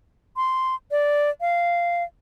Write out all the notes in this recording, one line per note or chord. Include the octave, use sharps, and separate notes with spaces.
C6
D5
F5